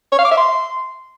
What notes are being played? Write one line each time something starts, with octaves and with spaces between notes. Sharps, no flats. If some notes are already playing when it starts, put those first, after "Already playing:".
C#5
F5
D6
E5
C6